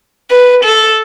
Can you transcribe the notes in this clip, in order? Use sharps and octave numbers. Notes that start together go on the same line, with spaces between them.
B4
A4